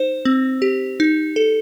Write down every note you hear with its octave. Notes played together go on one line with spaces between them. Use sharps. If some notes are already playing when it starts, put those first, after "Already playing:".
Already playing: D#4 C5
C4
G4
D#4
A4